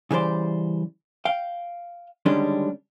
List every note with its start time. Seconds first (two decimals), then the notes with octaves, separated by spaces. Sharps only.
0.11 C#3 E3 G3 C5 D5
1.25 F5 G5
2.26 D3 D#3 G3 G#3 C#4 D4